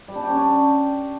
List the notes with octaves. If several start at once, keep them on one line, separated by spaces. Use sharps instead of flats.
G3
D4
G4
C#4
D4